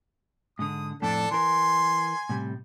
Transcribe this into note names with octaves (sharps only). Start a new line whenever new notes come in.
G#2 D3 D#6
F2 A2 D4 A4
E3 A#4 G#5 C6
A2 C3 G3